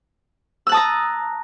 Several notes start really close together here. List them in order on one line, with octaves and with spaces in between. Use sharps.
E6 F#6 A5 D#6 A#5